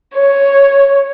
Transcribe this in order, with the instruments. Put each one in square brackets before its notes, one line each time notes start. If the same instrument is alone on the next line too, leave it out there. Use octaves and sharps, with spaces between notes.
[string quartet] C#5